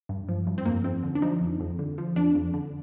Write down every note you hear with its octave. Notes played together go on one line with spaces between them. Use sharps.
G2
F3
G2
C4
F2 A#3
F2 C4
D3
D4
F3 D#4
F2
F2
D3
F3
F2 D4
F2
D3